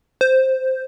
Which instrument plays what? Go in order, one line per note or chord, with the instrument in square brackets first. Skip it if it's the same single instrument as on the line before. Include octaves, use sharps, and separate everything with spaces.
[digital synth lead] C5